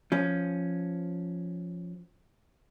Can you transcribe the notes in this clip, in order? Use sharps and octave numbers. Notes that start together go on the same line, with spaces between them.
F3 C#4